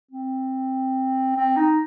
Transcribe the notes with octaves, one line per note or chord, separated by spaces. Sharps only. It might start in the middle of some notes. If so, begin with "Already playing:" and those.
C4
C4
D#4